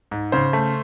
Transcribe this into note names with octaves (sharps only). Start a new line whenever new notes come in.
G#2
C#3 C5
A3